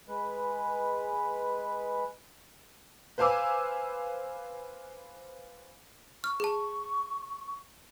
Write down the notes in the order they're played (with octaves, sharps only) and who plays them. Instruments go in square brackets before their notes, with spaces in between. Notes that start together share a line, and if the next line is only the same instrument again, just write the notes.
[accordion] G#3 B4
[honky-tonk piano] B4 C5 F5 G#5 D6 E6
[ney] C#6 [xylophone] F6
[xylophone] G#4 A5